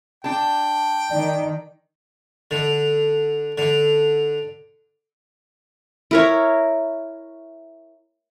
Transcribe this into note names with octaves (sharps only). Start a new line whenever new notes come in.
D4 G5 A5
D#3 D5
D3
D3
E4 A#4 C#5